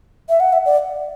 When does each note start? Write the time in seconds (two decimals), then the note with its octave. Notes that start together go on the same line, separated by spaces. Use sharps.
0.29 E5
0.40 F#5
0.53 E5
0.66 D5